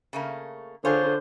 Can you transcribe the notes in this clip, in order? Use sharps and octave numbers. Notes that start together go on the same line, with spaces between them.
C#3 A3 A#3
D3 F4 G#4 C5 C#5